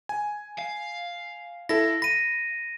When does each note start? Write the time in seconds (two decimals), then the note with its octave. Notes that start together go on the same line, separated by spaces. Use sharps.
0.09 G#5
0.58 F5
1.69 E4 A4 A#6
2.02 B5 A#6 D#7